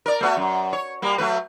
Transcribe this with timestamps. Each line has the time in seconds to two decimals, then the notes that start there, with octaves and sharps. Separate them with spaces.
0.06 A#4 D5
0.21 A3 B3 F#4
0.37 F#2
0.73 C#5
1.02 G3 A#3
1.18 F#3 A3 B4